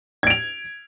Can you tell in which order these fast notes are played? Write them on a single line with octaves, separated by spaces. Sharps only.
G#6 D7 F7